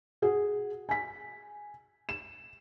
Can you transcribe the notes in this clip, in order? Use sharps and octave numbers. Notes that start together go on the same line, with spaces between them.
F#4 G#4 F#5
G#5 B6
E7